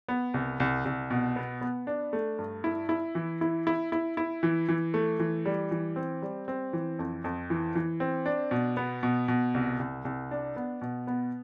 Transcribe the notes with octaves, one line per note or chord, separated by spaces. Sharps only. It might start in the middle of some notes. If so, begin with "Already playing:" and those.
B3
C2
C2
C2
B2
B3
B3
D4
A3
G2
E4
E4
E3
E4
E4
E4
E4
E3
E3
A3
E3
G3
E3
C4
G3
C4
E3
F2
F2
E3
E3
C4
D4
B2
B3
B2
B2
C2
C2
C2
D4
B3
B2
B3